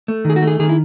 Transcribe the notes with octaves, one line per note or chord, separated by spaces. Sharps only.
A3
D#3 G#4
F#4
A3 G#4
D#3 G#4
E4